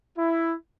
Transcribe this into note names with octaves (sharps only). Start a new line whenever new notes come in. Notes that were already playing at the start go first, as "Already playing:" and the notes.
E4